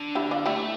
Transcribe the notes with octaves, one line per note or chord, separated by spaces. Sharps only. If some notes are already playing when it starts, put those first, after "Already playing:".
Already playing: D3
E4 G4
D4 F4
A3 E4 G4